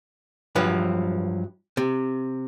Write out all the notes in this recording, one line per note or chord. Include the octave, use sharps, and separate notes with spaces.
G2 F3 F#3 B4
C3